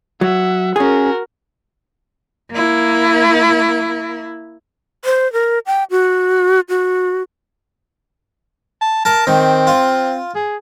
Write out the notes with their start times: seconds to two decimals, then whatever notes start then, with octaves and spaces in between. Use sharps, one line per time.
0.21 F#3 E5 F#5
0.76 C#4 F#4 G#4 A#4
2.51 A#3 E4
5.05 C5
5.33 A#4
5.66 G5
5.91 F#4
6.69 F#4
8.81 A5
9.05 A#4 A5
9.27 D#3 C4
9.67 F4
10.35 G#4